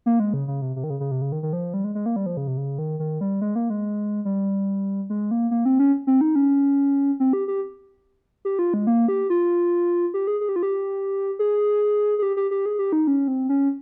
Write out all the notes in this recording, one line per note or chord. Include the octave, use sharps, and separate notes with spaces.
A#3
G#3
C#3
C#3
C3
C3
D#3
C#3
C#3
C3
C#3
D#3
D#3
F3
G3
G#3
G#3
A#3
G3
F3
C#3
C3
C#3
D#3
D#3
G3
G#3
A#3
G#3
G3
G#3
A#3
A#3
C4
C#4
C4
D#4
C#4
C4
G4
G4
G4
F4
G#3
A#3
G4
F4
G4
G#4
G#4
G4
F4
G4
G#4
G#4
G4
G4
G4
G#4
G4
D#4
C#4
C4
C#4